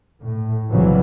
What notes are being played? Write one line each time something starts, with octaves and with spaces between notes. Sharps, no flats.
A2
B1 F2 C#3 E3 F#3 G3